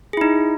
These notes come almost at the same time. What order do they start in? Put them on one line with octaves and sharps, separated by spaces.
G#4 E4 D#4